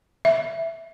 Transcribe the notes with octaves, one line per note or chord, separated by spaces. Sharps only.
E5